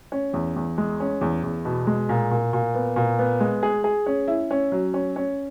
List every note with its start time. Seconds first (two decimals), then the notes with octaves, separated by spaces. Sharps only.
0.12 C#4
0.33 E2
0.56 E2
0.78 G#3
1.00 C#4
1.21 E2
1.43 E2
1.65 B2
1.87 G#3
2.09 A#2
2.31 A#2
2.53 A#2
2.75 B3
2.96 A#2
3.19 B3
3.40 G#3
3.63 G#4
3.84 G#4
4.06 C#4
4.28 E4
4.51 C#4
4.72 F#3
4.94 C#4
5.16 C#4